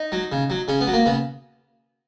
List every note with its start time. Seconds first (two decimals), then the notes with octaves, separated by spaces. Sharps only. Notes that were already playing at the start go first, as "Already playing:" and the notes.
Already playing: D#4
0.12 F#3
0.32 C#3
0.50 F#3
0.68 C#3 C#4
0.81 B3
0.87 F#3
0.93 A#3
1.06 C#3 B3